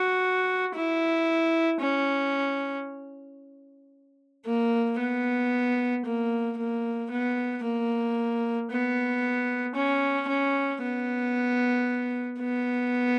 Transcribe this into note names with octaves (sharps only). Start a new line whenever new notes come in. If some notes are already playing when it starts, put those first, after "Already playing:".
Already playing: F#4
E4
C#4
A#3
B3
A#3
A#3
B3
A#3
B3
C#4
C#4
B3
B3